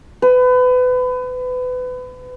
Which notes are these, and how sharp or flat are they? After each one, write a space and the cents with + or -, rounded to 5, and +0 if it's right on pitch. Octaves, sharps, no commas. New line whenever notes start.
B4 +30